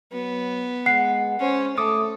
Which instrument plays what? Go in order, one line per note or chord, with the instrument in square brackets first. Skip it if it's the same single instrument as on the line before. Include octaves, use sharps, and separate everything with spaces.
[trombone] F#3 [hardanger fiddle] B3
[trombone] G#3 [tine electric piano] F#5 [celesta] C7
[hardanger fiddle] C#4 [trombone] C5
[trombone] A3 [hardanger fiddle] A4 [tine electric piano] D6 D#6